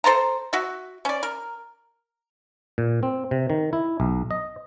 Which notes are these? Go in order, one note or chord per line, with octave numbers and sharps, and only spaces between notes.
A4 C5 A5 A#5
F#4 E5
C#4 D5
A#4
A#2
C4
C3
D#3
E4
B1
D#5